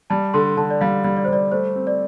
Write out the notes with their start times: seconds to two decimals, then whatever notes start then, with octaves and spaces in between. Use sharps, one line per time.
0.10 G3 A5
0.34 D3 C6
0.57 D3 A5
0.70 D5
0.81 G3 F5
1.04 G3
1.16 D5
1.25 C5
1.28 G3 D5
1.52 A3 C5
1.76 C4
1.87 D5